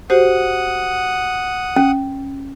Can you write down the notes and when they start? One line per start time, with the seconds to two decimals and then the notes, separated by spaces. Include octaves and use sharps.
0.10 F#4 G4 C5 F#5 D#6
1.76 C#4